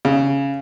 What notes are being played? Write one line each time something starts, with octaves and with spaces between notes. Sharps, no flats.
C#3